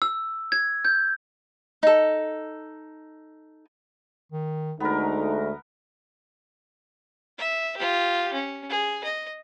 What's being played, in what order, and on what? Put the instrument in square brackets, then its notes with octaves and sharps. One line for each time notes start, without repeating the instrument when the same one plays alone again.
[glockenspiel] E6
G#6
G6
[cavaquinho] D#4 A4
[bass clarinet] D#3
[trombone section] D2 G#3 A3 [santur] B3 A#4 [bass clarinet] D#4
[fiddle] E5
F4 G4
C#4
G#4
D#5